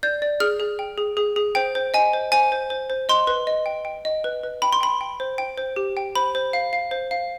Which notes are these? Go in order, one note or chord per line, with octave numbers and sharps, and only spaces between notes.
D5 G6
D5
G#4 F6
G#4
G5
G#4
G#4
G#4
C5 G5
C5
D#5 G#5
C5
C5 G#5
C5
C5
C5
D#5 C6
B4
D#5
G5
G5
D#5
B4
B4
G5 B5
C6
G5 B5
G5
C5
G5
C5
G4
G5
C5 B5
C5
F5
F5
C5
F5